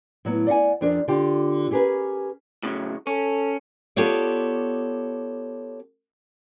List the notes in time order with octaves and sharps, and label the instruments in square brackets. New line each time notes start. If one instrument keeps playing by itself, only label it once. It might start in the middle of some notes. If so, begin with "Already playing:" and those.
[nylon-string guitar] A2 F#3 B3
D5 D#5 F5 F#5 G#5
F2 F3 D4 G#4 A#4
D3 F4 G4 G5
C#4 G4 G#4 A#4 B4
[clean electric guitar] A2 C#3 F#3
[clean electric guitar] C#4 [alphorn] A4
[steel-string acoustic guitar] B3 F4 G4 A4 C#5 D5